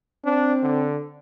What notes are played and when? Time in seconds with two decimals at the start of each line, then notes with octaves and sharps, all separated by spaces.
0.25 C4 D4
0.63 D3